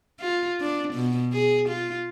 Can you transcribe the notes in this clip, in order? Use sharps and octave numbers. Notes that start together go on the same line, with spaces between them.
F4
D4
B2
G#4
F4